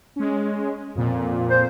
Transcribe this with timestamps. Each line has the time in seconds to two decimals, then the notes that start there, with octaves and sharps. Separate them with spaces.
0.16 G#3 C#4
0.95 F2 A#2
1.49 C5